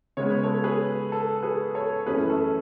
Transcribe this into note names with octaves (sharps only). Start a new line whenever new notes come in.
C#3 G#3 B3 C#5
B4
A4 C#5
G#4 B4
A4
G#4 B4
A4 C#5
F#2 E3 A3 C#4 E4 G#4 B4
A4